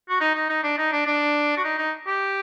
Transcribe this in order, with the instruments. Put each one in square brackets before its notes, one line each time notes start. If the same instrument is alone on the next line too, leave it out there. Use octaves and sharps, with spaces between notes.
[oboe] F#4
D#4
D#4
D#4
D4
D#4
D4
D4
F#4
D#4
D#4
G4